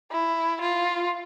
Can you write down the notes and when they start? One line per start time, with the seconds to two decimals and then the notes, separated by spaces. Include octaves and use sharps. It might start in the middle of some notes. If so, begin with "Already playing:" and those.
0.11 E4
0.61 F4